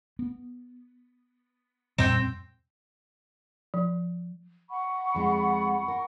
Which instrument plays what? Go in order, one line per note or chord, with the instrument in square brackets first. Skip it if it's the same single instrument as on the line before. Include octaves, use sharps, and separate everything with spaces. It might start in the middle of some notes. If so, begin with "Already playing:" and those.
[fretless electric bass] B3
[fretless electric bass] F2 A#2 G3 [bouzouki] C4 G5
[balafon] F3
[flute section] F#5 B5 C#6
[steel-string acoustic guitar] F2 G#3 F4
A#4